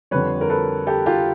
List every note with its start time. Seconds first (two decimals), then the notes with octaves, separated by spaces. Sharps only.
0.11 F2 D3 G3 B4 C#5
0.41 A#4
0.49 A4 B4
0.87 G4 A4
1.06 F4 G4